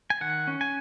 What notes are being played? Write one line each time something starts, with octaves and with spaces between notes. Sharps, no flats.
G#5
D#3 F#5
C#4
G#5